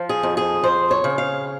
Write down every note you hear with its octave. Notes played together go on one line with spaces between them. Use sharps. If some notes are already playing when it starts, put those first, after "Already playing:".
Already playing: F3
G#4
F2
G#4
F2 C5
C#5
C#3
F5